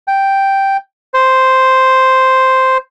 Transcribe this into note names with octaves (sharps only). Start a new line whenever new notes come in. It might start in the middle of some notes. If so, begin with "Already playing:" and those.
G5
C5